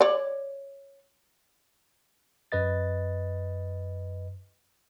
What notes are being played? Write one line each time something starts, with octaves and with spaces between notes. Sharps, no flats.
C#5 D5
F#2 B4 D#5 A6